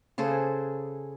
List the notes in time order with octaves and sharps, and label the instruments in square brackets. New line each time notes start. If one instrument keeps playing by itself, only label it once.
[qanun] C#3 G#4 A4 C5